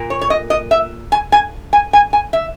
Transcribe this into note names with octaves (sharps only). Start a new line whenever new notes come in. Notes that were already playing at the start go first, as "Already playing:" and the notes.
Already playing: A#2 A#3
C#5
C#5
D#5
D#5
E5
G#5
G#5
G#5
G#5
G#5
E5